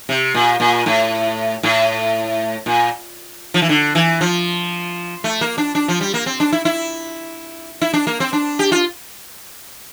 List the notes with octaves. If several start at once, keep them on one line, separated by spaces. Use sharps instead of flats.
C3
A#2
A#2
A2
A2
A#2
F3
E3
D3
E3
F3
A3
A#3
D4
D4
F3
G3
A#3
C4
D4
E4
E4
E4
D4
A#3
C4
D4
G4
F4